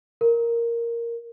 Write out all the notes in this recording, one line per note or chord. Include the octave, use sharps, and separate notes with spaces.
A#4